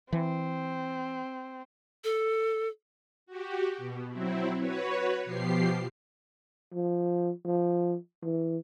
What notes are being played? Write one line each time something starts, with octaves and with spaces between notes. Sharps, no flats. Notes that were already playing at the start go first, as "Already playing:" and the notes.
E3 C4
A4
F#4 G4
B2
F#3 C4 E4
F#4 B4 C#5
B2 F3 G4 C7
F3
F3
E3